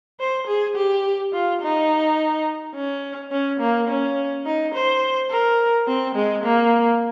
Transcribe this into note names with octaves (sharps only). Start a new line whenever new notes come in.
C5
G#4
G4
F4
D#4
C#4
C#4
A#3
C#4
D#4
C5
A#4
C4
G#3
A#3